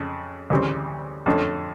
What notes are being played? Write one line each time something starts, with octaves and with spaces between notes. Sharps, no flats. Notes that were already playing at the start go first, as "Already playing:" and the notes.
Already playing: F2 C#3
D2 C#3 E3 G3 C4
F2 D3 F3 A3 C#4